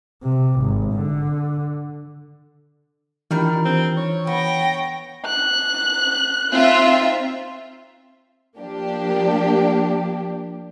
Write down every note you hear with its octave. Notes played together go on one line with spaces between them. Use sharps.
C3
G#1
D3
D#3 E3 G3 D4 F4 A#4
C4
C#5
B3 G5 A#6
F#6
C4 D#4 F4 E5
F3 A#3 D4 G4